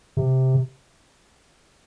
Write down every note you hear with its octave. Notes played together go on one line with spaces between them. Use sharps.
C3